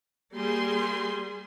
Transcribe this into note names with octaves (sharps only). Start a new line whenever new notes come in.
G3 A#3 G#4 C6